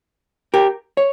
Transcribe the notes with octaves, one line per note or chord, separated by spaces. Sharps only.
G4 A#4
C#5